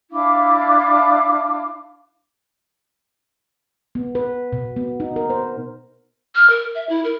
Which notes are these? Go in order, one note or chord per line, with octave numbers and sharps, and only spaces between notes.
D4 E4 F5 D6
B3
B4
B2
B3
D#4
A#4
C5
F6
A#4
E5
E4
A#4